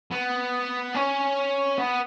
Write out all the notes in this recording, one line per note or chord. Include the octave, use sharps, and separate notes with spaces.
B3
C#4
B3